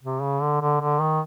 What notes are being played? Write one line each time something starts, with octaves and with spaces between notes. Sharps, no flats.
C3
C#3
D3
D3
D3
D#3